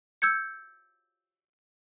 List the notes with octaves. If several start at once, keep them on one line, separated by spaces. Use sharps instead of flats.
E6 G6 G#6 C#7